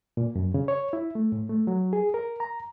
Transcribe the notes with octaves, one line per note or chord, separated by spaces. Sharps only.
A#2
F#2
C#3
C#5
E4
A3
A2
A3
F#3
G#4
A#4
A#5